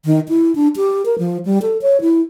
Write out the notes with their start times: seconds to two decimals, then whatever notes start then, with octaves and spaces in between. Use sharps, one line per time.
0.05 D#3
0.29 E4
0.55 D4
0.76 G4
1.05 A#4
1.19 F3
1.45 G3
1.62 A4
1.82 C#5
2.01 E4